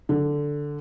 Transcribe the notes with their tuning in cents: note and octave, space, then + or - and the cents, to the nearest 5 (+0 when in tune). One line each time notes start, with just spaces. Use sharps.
D3 +0